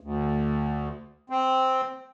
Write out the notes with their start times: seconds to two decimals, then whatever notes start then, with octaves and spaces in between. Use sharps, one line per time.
0.01 D2
1.30 C4